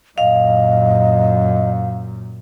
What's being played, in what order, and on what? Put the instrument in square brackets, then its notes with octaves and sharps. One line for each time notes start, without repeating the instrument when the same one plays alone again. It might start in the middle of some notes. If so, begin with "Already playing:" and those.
[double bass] F#2 A#2 [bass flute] D#5 [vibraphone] F5